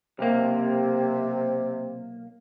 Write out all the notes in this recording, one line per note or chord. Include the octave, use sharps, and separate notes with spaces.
B1 C3 A#3